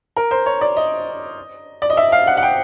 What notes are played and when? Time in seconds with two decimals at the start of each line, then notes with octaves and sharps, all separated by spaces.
0.16 A#4
0.31 C5
0.46 C#5
0.61 D5
0.76 D#5
1.82 D5
1.90 D#5
1.97 E5
2.12 F5
2.27 F#5
2.37 F#5
2.43 G5